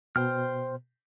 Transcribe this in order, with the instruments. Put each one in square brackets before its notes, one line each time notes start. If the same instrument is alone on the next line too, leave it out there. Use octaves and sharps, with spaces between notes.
[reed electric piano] B2 [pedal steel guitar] C5 G5 F6